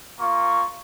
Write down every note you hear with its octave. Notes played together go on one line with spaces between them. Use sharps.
A#3 F4 C#6